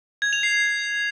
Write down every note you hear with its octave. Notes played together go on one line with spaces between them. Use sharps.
G#6
F7
C7